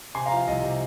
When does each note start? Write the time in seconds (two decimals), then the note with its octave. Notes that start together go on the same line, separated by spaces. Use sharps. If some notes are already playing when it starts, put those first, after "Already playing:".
0.15 C3 G#5 C6
0.26 F5 A#5
0.32 F3
0.37 F5
0.47 C2 D#5
0.63 C3